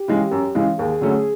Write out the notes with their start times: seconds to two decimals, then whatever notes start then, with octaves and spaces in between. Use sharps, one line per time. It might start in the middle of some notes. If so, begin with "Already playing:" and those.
Already playing: G4
0.08 C#3 E3 G#3
0.31 F#2
0.55 C#3 E3 G#3
0.78 D#2 G#4
1.01 D3 F#3 A3 C#4